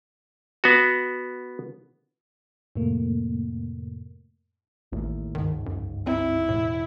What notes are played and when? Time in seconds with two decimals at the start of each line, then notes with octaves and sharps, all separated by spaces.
0.64 B3 F#4
2.75 F2 A2 C3 A3 A#3
4.92 A1 D#2 A2
5.35 G1 C#2 G#2 D#3
5.66 F#2
6.07 C4 E4
6.49 E1 A2